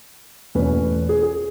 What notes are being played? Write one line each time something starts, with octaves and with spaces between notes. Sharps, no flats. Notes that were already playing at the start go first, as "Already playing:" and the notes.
E2 B2 A3 C#4 B4
G#4
G#4